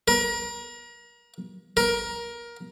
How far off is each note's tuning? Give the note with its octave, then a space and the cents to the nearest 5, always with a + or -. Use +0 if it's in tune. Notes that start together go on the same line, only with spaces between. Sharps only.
A#4 +35
A#4 +20